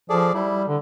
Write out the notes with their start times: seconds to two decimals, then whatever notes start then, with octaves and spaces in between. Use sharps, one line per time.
0.10 F3 G#4 A4 D5
0.34 G3 E4
0.67 D3